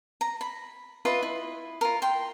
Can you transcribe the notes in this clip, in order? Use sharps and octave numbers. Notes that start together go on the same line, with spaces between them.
A#5
B5
F4 B4 D#5 E5
E4
F4 A#4
G5 C6